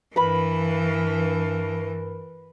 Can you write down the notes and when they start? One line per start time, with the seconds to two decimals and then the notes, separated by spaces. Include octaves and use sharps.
0.16 G2 E3 A#4 B4 B5